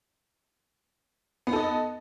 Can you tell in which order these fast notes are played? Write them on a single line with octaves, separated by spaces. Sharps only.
B3 D#4 A4 D#5